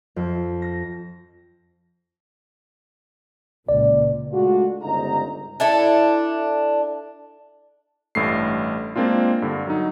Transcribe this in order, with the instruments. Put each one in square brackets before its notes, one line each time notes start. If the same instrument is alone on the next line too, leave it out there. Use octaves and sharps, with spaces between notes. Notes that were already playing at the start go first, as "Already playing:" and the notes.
[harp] F2
A#6
[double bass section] C#2 A#2 [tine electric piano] D5
[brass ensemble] G#3 A3 D4 F4 F#4
G1 C#2 C3 D#4 A#5
[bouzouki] D4 E4 A4
[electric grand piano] A1 G2 A3 C7
G#3 A#3 C4 D4 F4
G2 D3
F#3 D#4